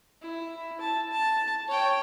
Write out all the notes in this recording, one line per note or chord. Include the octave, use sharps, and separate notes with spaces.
E4
A5
A5
C#5 G5